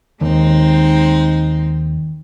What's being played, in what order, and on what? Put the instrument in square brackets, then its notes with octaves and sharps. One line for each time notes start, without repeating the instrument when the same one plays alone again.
[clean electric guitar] D#2 [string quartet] G#3 C4 D#4